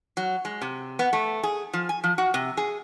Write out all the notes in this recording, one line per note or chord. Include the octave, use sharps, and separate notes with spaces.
F#3
G#3
C3
B3
A3
G#4
F3
G#5
F3
F#4
C3
G#4